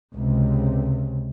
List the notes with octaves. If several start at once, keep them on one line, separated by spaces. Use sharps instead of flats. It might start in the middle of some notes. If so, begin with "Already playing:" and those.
C#2 C3